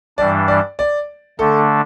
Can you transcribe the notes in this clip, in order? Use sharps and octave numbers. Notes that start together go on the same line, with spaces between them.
G2 E3 G3 D4 D5
D5
D5
D3 A3 D4 A4